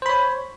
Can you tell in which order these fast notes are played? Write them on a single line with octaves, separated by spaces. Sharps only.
C5 B5 C#5